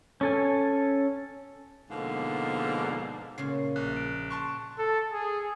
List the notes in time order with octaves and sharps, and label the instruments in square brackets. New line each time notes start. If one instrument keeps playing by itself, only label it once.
[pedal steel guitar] C#4 A4 G#5
[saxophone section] G#2 B2 D3 F3 A#3
[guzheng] A#2 C#3 [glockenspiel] C7
[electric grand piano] A#1 [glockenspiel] F#6
[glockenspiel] D7
[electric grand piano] A5 C6 C#6
[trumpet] A4
G#4